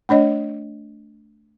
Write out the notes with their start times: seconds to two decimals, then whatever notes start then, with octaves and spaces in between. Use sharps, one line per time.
0.09 A3 D4 C#5 D#5